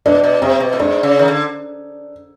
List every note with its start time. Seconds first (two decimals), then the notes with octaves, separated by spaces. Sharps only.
0.06 B2 D4
0.24 B2
0.42 C3 C4
0.60 B2
0.73 A2
0.79 G#2 D4
1.03 C#3
1.19 D#3
1.28 D3